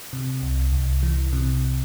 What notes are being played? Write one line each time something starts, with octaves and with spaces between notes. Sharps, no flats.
C3
C2
C2
E3
C3